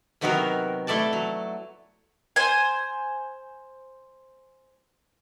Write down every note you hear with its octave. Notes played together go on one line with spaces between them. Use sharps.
C3 D#3 F#3 B3 F#4 A#4
A3 E4 A4 D5 A5
F#3
C5 G#5